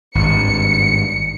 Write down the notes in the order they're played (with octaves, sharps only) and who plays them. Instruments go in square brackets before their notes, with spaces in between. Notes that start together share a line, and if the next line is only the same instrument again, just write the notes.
[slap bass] G#1 G2 [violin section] C#7